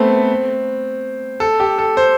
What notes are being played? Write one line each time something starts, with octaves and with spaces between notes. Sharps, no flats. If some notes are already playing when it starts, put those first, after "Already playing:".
Already playing: A3 B3 C4
A4
G4
A4
C5